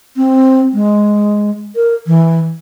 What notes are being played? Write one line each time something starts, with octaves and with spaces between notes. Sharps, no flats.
C4
G#3
A#4
E3